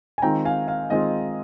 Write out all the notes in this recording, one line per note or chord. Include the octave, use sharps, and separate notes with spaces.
G#5
D#3 G#3 C4 F4 G5 A#5
F5 G#5
F5
D#3 G#3 C4 F4 D#5